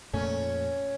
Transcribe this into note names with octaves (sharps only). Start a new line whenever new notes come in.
F2 A#2 A3 C#4